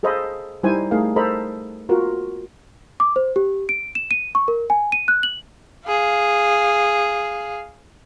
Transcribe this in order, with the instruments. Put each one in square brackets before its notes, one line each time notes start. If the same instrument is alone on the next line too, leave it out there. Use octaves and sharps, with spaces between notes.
[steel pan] G#4 A4 C5 D#5 F5 B5
G3 D#4 E4 C5 G#5
A3 D#4 G#4 A#4 F5
A4 A#4 C5 D#5 A#5 B5
F4 F#4 A#4
[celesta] D6
C5
G4
D7
E7
D#7
C#6
A#4
G#5
D#7
F#6
F#7
[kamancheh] G#4 F5